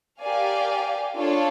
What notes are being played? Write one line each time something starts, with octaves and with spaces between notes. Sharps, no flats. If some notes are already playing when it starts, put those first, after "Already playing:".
G4 A#4 D5 F5 G#5
D4 F4 A4 C#5